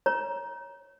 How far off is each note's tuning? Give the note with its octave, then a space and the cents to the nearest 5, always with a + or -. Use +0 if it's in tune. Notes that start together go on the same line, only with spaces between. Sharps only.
C#5 +0 A#5 +20